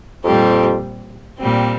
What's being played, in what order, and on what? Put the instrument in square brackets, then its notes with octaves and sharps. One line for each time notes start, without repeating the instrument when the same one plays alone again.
[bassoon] F2 [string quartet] A#2 G3 C4 G4
[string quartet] A#2 G3 C4